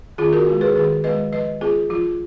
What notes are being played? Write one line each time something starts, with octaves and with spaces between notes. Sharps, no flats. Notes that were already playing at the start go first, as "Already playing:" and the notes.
D#3 F4 G#4
F#4 A#4
G#3 B3
G#4 B4
D#3 G#4 B4
G#3 B3 B4 D#5
F3 B4 D#5
B3 F4 G#4
F3 F4